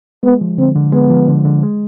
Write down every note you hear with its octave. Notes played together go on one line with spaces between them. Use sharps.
G#3 B3
F3
D3 C4
D3
G#3 B3
F3
D3
D3
G#3